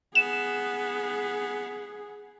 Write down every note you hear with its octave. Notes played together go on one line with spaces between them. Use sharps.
B3 G#4 E7